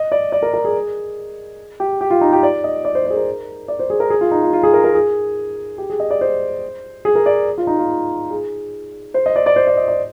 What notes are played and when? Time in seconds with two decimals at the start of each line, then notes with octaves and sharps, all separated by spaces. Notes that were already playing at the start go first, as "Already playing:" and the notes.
Already playing: D#5
0.12 D5
0.32 D5
0.43 A#4
0.54 A#4
0.65 G#4
1.80 G4
2.01 G4
2.10 F4
2.21 D#4
2.33 G4
2.43 D5
2.64 D#5
2.85 D5
2.95 C5
3.06 G#4 C5
3.17 A#4
3.68 D5
3.79 C5
3.90 G#4
4.00 A#4
4.10 G#4
4.21 F4
4.31 D#4
4.42 F4
4.53 F4
4.63 G#4
4.74 A#4
4.84 A#4
4.94 G#4
5.78 G4
5.90 G#4
6.00 D#5
6.11 D5
6.21 C5
7.05 G#4
7.15 A#4
7.26 D5
7.58 F4
7.67 D#4
7.79 F4
8.31 G#4
9.14 C5
9.26 D#5
9.36 D5
9.46 D5
9.56 C5
9.67 D5
9.77 D#5
9.88 D5